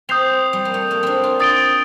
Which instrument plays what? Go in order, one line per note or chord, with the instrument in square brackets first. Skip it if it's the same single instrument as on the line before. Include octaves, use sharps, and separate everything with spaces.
[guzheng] C4 [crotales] D#6 G6 C7 F7
[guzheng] G3
A#3
A3
A#3
C4 D4
F4
[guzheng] D#4 [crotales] D#6 A6 D7 G7